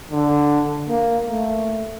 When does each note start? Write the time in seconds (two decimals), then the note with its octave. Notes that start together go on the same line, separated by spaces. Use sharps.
0.11 D3
0.89 A#3
1.26 A3